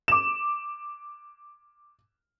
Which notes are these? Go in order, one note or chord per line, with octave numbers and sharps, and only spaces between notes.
D6 E7